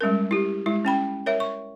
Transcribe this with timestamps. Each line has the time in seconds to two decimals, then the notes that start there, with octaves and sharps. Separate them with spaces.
0.01 G3 G#3 C#4 A#4
0.31 E4 G4
0.66 G#3 E4
0.85 C#4 G5 B5
1.26 A#4 C#5 E5
1.40 C#6